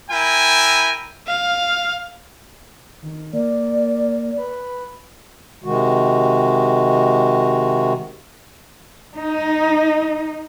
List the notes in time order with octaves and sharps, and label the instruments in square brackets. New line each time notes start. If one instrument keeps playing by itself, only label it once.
[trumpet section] E4 A#4 G5 G#5
[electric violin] F5
[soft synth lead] D#3
[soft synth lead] A#3 [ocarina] D5
[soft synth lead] B4
[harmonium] C3 D#3 G#3 F#4
[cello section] D#4